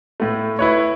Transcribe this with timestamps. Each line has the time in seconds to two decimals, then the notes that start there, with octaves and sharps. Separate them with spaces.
0.20 A2 A3
0.59 E4 B4 C#5